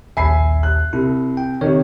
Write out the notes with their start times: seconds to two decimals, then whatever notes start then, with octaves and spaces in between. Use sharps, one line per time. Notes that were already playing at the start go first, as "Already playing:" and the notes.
0.17 A#1 D#2 E5 G#5 B5 C7
0.63 F#6
0.93 C2 E4
1.37 G5
1.61 C3 D#3 C#5